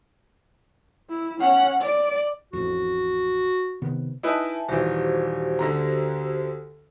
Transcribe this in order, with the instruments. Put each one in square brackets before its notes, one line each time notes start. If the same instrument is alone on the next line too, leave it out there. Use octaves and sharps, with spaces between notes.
[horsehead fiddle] E4
C#4 F#5
D5
[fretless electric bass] A1 F2 [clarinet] F#4
[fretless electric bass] C3 D#3 B3
[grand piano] D#4 E4 B4 [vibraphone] E5 G#5 A5
[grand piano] D#1 E3 [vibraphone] F#4 G4 C5
[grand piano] D2 D3 A#5